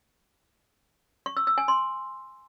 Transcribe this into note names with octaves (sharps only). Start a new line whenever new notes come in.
C#6
E6
E6
G#5
C6